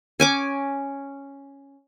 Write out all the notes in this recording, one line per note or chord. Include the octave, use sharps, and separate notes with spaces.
C#4 G#5 D6